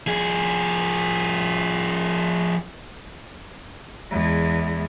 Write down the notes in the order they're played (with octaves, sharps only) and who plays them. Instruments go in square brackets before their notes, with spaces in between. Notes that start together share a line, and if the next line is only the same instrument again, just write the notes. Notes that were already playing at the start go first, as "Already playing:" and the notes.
[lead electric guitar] F3 G#4
[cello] E2 G#3